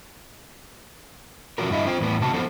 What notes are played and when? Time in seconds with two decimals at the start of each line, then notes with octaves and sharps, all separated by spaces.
1.58 C3 F3 F#3 F#4 A#4
1.70 G2 D3 E4 D#5 F5
1.86 C4 F4 C5 G5
2.01 E2 A2 E3 B3
2.21 C3 A#3 D4 F#4 A5
2.33 F3 B3 A4 C5